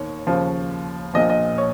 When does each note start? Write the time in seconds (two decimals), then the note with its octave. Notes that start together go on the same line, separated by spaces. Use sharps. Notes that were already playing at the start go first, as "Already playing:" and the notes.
Already playing: D#2 D#3 C#5
0.27 D#2 C#3 F3
1.14 A#1 A#2 F3 D#5
1.30 D#5
1.58 C#5